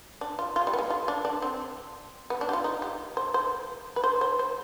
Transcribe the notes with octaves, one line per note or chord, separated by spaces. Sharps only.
D4
F4
F4
G#3
G3
B3
G#3
F4
D4
D4
C4
B3
D4
G4
F4
D#4
G4
C5
C5
B4
C5
C5
C5